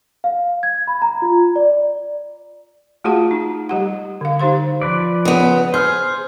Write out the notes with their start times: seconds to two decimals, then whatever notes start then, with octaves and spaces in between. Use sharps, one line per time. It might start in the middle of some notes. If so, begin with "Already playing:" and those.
0.24 F5
0.63 G#6
0.87 B5
1.02 A#5
1.22 F4
1.56 D5
3.04 A3 F4 F#4 G#4 F#5 A5
3.31 D#4
3.69 G3 G4 F#5
4.21 D3 F5
4.39 D#4 G4 C5 F5 C6
4.82 F3 B4 D5
5.25 C#3 B3
5.74 G#4 C5 F6